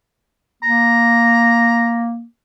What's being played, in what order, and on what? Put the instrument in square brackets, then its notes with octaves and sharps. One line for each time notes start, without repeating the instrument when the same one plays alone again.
[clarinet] A#3 [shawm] A#5